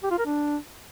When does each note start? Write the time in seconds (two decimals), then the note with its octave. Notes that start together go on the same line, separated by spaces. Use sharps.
0.03 G4
0.11 F4
0.18 A#4
0.26 D4